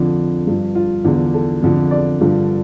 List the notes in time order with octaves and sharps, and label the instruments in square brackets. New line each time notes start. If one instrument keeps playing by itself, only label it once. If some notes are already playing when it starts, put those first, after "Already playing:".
Already playing: [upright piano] F2 D3 F3
G2 F3
F4
E2 D3 F3
A4
F2 D3 F3
D5
G2 D3 F3